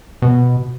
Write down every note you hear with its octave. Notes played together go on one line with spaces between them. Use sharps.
B2